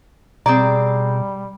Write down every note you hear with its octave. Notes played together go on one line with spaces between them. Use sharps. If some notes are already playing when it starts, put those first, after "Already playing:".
B2 G3 C4 G#4 D5 A#5